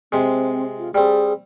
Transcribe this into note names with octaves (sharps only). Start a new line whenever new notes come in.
C3 G#3 C4
F4
G3 C4 G#4